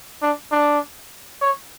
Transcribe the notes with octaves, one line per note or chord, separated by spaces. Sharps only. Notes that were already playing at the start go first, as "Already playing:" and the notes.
D4
D4
C#5